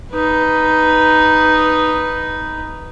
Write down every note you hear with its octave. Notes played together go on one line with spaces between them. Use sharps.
D#4 B4